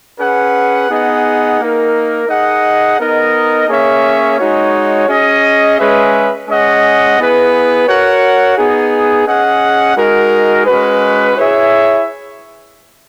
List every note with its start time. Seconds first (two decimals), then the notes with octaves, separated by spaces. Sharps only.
0.19 C#4 G#4 B4 F#5
0.90 B3 D#4 G#4 D#5 F#5
1.60 A#3 D#4 A#4
2.28 D#4 G#4 D#5 F#5
2.98 B3 D#4 A#4 D#5
3.68 A#3 C#4 G#4 C#5 E5
4.38 G#3 D#4 F#4 C#5
5.08 C#4 G#4 D#5
5.78 G#3 C#4 G#4 B4 E5
6.48 G#3 C#4 G#4 D#5 F#5
7.18 B3 E4 G#4 B4
7.87 F#4 A#4 C#5 F#5
8.57 B3 D#4 G#4
9.27 C#4 G#4 D#5 F#5
9.96 G#3 D#4 F#4 A#4
10.66 G#3 C#4 F#4 B4
11.37 E4 G#4 C#5 E5